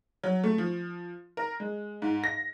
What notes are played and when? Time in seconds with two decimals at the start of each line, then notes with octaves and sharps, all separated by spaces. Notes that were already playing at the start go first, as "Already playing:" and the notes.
0.24 F#3
0.44 A3
0.58 F3
1.37 A#4
1.60 G#3
2.02 G#2
2.24 A#6